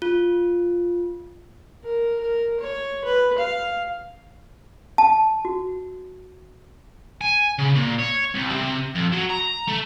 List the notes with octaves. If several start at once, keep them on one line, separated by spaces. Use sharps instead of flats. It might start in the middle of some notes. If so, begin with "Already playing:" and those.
F4
A#4
A#4
C#5
B4
F5
A5
F#4
G#5
C#3
A#2
C#5
C2
C3
F2
F#3
A#5
A3